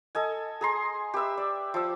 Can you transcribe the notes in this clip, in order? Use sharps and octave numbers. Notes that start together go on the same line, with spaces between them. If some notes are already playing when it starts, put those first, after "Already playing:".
A4 D#5 G#5
G#4 A#5 C6
G4 B4 E5 E6
D5
F3 E6